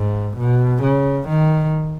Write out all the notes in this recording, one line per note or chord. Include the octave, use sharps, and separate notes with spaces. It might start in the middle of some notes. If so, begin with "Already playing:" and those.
Already playing: G#2
B2
C#3
D#3